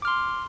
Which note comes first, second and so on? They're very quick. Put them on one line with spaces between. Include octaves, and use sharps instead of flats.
D6 F6 C6